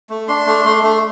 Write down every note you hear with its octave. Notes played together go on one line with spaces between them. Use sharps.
A3
D4 C6
A3
A3
A3